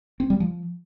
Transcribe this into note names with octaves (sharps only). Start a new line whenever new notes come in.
C4
G3
F3